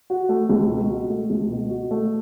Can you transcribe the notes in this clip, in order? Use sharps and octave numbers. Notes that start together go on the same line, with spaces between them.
F#4
A3
C#2
B2
F#4
A3
C#2
B2
F#4
A3